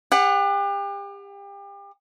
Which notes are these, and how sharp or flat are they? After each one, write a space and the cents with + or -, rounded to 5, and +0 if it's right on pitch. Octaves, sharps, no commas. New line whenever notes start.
G4 +35 F#5 +0